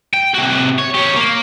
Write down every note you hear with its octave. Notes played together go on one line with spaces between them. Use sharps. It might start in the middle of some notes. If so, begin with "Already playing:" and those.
G5
C3 F#4
C#5
G4 C#5
A#3